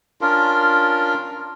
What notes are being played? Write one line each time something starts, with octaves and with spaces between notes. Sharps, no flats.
C#4 D4 F4 A#4